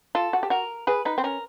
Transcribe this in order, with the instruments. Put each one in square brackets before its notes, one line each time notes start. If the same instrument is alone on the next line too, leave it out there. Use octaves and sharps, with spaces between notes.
[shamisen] F4 [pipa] A4
[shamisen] F#4
G4
[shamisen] F#4 [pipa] A#4
[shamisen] G#4 [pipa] B4
[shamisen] D#4 [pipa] B4
[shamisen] C4
[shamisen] C#4 [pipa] A#4